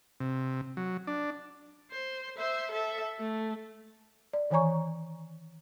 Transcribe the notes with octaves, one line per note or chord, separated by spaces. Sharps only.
C3
F#3
D4
C5
C5 E5
A4 E5
A3
D5
D#3 E3 C#5 G#5 A#5 C#6